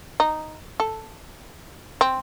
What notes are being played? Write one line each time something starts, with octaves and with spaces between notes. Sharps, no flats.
D#4
A4
C4